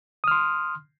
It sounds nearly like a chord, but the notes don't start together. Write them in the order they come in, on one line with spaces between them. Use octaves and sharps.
D#6 F6 C6